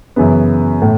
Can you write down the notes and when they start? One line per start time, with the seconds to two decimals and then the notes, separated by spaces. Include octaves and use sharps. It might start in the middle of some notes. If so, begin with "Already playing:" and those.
0.16 F#2 C#3 E3 B3
0.82 A2